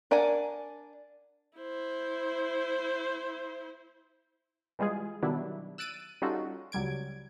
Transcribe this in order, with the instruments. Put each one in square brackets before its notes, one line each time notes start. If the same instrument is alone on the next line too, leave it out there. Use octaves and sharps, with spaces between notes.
[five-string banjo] D4 A#4 D5 F#5 G#5
[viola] E4 C5
[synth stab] E3 G3 G#3 F4 G#4
B2 D#3 F#3 G3 D4 E4
E6 F#6 A6 D7 D#7
G3 C#4 D#4 F4 F#4 A4
C#2 F#3 G3 G#6 D7